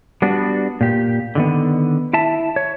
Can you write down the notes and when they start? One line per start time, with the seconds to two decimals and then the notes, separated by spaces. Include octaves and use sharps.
0.22 G3 B3 D4 F#4
0.81 A#2 G4
1.35 D3 D#3 B3
2.13 E4 E5 A5
2.56 C#5